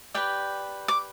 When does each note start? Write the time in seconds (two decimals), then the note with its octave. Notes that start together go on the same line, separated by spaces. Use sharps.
0.14 G4 B4 D5 G5
0.88 D6